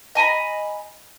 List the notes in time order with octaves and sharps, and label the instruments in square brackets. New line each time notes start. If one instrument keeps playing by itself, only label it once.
[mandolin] D#5 G#5 A#5 B5